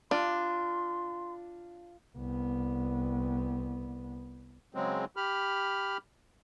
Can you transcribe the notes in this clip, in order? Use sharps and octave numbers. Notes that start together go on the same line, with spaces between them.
D4 F4 C6
C2 B3
C#3 F#3 G#3 C4
G4 B5 F6